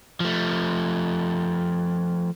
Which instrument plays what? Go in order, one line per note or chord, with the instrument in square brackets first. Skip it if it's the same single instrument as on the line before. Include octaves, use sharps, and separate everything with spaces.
[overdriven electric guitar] F3 A3